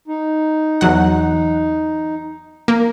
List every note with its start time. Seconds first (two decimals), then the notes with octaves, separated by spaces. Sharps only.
0.08 D#4
0.81 E2 F#3 F#5
2.68 A#3